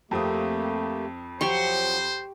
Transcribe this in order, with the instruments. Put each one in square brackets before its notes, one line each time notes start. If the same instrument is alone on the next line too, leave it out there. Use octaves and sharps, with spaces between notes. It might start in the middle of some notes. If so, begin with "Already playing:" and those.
[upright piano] F2 C4 D#6 [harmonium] A3 A#3 G4
[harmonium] F3 F#3 [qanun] G4 C6 C#6 [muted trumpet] C5